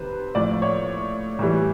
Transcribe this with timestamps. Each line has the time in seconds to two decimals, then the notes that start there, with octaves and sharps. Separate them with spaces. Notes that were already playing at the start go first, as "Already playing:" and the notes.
Already playing: C3 D#3 B4 C5
0.35 A2 F3 D5
0.62 C#5
1.39 A2 E3 G3